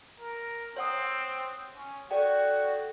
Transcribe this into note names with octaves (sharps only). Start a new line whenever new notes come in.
A#4
C4 C#5 F#5 D#6
C#4
F#4 A4 D5 G5